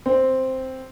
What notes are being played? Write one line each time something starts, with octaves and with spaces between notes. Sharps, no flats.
C4